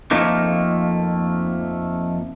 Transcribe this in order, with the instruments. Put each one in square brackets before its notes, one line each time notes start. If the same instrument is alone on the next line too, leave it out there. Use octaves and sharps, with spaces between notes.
[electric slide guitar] F2 F3 A3 A#3 D#4